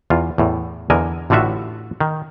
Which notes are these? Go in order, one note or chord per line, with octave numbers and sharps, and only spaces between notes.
E2 F4
E2 A2
E2 D3 A#4 D#5 G#5
A1 A2 D3 F4 F#4 E5
D#3